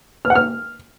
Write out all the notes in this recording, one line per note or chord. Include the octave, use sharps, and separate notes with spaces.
F6
F#5
F6